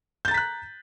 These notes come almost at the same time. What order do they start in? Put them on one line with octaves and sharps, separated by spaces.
G6 A6 A#5 B6 F#6